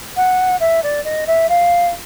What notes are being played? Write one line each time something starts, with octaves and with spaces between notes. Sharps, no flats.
F#5
E5
D5
D#5
E5
F5